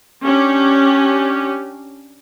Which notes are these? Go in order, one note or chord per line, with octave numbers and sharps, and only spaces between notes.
C#4 D4 G4